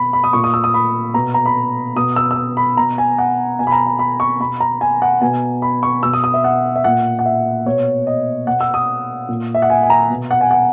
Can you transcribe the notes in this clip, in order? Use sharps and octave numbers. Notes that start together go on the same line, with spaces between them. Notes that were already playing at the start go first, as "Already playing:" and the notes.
Already playing: B2 B5
B5
D#6
A#2 C#6
D#6
E6
D#6
B5
B2 A#5
A#5
B5
B2 D#6
E6
E6
D#6
B5
B2 A#5
G#5
F#5
B2 G#5
B5
A#5
A#5
B5
C#6
B2 B5
A#5
G#5
F#5
B2 G#5
B5
C#6
B2 E6
D#6
D#6
E5
F#5
E5
A#2 F#5
F#5
E5
B2 C#5
D#5
B2 F#5
E6
D#6
A#2
E5
F#5
G#5
G#5
A#5
B2
F#5
G#5
F#5